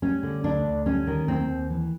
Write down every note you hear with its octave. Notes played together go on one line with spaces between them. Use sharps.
G3 C#4
D3
D2 D4
D2
G3 C#4
D#3
D#2 C4
D#2
E3